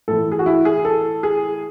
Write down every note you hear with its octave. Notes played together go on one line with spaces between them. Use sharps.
A2 E3 A4
G#4
F#4
E4
G#4
A4
G#4